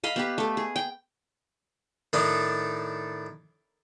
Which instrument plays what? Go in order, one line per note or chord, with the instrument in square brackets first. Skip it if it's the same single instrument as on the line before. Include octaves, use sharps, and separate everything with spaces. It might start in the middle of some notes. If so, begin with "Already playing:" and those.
[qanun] D#5 F5 B5
B3 G4 B4
A3 A4
G#4
G5
[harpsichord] A2 D#3 D4 D#4